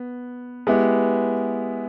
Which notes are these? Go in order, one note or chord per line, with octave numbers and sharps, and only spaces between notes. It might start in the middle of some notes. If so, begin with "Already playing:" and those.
Already playing: B3
G#3 B3 E4 G4